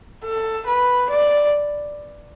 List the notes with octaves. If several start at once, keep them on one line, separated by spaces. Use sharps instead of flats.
A4
B4
D5